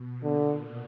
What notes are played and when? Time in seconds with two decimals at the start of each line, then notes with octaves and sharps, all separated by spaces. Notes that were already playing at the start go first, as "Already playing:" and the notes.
Already playing: B2
0.23 A#2 D3